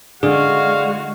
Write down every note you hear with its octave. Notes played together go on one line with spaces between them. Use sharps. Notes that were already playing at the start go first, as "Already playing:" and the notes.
D3 G#3 F#4 G#4 D5 F5